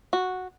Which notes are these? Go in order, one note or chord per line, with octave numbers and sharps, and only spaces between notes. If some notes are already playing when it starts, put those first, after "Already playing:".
F#4